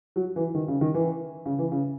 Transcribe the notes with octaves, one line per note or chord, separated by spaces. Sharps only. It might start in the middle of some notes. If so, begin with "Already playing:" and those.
F#3
E3
D#3
C#3
D#3
E3
C#3
E3
C#3